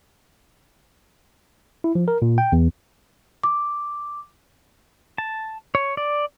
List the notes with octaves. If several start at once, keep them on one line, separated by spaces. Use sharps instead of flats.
E4
F3
A#4
A#2
G5
E2
D6
A5
C#5
D5